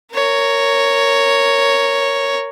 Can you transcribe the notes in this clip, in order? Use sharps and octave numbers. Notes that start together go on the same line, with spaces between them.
A#4 C#5